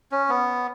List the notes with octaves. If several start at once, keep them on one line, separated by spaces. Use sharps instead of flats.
C#4
B3